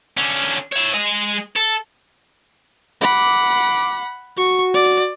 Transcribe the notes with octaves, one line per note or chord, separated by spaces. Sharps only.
D3 C#4
C#5 E5
G#3 D#5
A4
F#5 B5 D6
F#4 C#6
D5